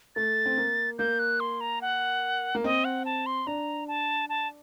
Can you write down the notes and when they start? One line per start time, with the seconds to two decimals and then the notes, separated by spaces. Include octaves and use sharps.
0.16 A3 A6
0.46 C4
0.57 A#3
0.99 A#3 G6
1.19 F#6
1.40 C6
1.61 A#5
1.82 F#5
2.55 A#3
2.64 C4 D#5
2.85 F#5
3.05 A5
3.26 C6
3.47 D4 A#5
3.88 A5
4.29 A5